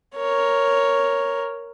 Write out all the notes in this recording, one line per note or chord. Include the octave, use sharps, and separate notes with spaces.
A#4 C#5